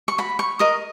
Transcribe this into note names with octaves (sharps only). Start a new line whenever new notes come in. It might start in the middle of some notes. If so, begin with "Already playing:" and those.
C#6
F#4 B5
C#6
A#4 D#5 D#6